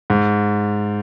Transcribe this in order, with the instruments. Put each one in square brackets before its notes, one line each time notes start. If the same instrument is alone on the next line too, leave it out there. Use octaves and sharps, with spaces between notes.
[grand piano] G#2